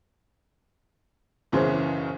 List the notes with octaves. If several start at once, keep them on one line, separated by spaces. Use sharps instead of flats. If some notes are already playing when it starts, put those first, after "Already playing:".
F#1 B1 C#3 E3 C#4 C5